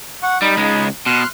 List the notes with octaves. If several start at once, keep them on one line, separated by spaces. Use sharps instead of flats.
F#5 C#6
G3 D#4 B5
C#2 G#3
B2 C6 F6 F#6